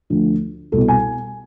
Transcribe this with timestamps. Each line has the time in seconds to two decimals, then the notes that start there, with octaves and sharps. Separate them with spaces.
0.10 D2 D3 F3
0.72 C2 B2 A4
0.88 G#5